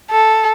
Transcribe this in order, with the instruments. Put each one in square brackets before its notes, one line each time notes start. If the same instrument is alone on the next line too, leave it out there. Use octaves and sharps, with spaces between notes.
[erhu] A4